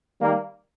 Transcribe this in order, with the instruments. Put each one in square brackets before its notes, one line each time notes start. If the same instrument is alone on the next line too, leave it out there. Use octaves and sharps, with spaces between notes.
[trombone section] D#3 G3 A#3